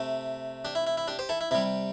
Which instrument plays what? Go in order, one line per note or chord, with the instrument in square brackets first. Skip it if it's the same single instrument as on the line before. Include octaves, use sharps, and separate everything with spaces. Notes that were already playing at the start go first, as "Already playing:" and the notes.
Already playing: [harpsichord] C3 A3
D4 G4
E4
E4
E4
D4 G4
G4 C5
E4 A4
E4
C3 G3 E4